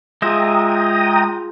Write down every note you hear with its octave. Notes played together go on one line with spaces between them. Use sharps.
G#3 F4 G4 G#4 E5 G5 A#5 D#6